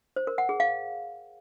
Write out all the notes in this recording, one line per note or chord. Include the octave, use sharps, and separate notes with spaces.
C5
A#4
F#5
G#4
F5